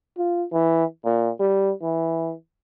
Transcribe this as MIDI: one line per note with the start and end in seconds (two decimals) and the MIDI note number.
0.18 0.45 65
0.52 0.84 52
1.05 1.30 46
1.40 1.73 55
1.82 2.33 52